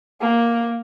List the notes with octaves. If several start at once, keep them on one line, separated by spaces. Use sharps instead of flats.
A#3